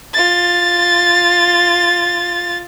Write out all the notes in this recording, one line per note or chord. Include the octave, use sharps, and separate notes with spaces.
F4 A6